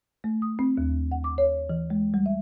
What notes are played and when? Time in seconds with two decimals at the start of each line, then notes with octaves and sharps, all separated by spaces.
0.24 A3
0.42 D#6
0.59 C4
0.77 D#2
1.12 F#5
1.24 D6
1.38 C#5
1.70 E3
1.90 G#3
2.14 G3
2.26 E5